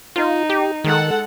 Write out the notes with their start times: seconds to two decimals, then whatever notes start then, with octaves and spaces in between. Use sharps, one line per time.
0.16 D#4 F4
0.50 G4
0.84 D#3 G#3 A4 F#5